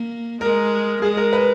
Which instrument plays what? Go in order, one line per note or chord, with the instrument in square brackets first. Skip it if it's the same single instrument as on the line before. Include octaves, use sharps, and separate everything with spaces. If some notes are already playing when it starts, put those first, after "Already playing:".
Already playing: [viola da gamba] A#3
[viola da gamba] G#3 [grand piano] A#4
[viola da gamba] G#3 [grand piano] G#4
[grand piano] A#4
B4